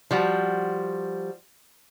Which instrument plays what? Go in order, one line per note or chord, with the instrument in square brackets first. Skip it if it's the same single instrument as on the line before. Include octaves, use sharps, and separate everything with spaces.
[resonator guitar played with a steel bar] F3 G3 F#4